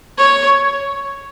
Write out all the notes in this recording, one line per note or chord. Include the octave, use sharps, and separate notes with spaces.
C#5